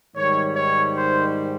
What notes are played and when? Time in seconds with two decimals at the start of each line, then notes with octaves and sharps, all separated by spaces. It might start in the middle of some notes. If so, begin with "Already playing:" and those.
0.15 G#2 D#3 G3 C#5
0.54 C#5
0.94 C5